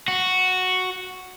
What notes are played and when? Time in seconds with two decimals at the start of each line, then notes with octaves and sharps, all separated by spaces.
0.08 F#4